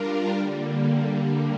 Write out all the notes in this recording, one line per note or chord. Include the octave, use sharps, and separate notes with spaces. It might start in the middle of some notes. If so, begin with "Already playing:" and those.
Already playing: G3 D4 F4 A#4
D3 G3 A#3